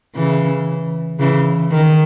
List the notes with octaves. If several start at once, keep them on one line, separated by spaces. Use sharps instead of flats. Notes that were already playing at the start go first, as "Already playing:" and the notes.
C#3 E3
C#3 E3
D#3